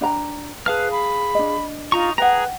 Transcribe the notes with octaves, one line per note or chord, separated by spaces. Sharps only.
D4 G5 A#5
G#4 B4 F5 A5 F6
B5
D4 D#5
D#4 F4 A#5 C#6
G#4 B4 F#5 G5 A#5